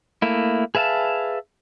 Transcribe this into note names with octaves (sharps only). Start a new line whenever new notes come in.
A3 A#3 E4
G#4 B4 E5 F5 A5